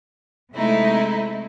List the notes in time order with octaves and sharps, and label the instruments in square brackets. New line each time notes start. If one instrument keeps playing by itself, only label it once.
[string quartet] C3 G#3 A3 D#4 E4